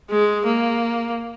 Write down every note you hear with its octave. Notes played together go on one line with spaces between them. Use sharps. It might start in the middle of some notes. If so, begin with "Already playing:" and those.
G#3
A#3